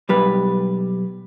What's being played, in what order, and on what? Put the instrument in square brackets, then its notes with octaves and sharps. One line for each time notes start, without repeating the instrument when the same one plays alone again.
[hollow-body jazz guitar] B1 G3 B4